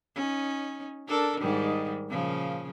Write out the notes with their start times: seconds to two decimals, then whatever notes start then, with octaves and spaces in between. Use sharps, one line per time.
0.15 C#4 D#4
1.07 D4 A4 A#4
1.40 G#2 D#3 G3
2.09 A#2 C#3 F3